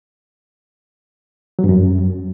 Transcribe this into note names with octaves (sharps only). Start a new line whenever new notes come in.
F#3
G2
F#2